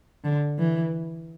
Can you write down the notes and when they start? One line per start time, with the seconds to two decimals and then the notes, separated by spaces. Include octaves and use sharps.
0.24 D3
0.59 E3